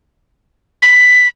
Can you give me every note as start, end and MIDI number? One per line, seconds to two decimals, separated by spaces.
0.82 1.28 95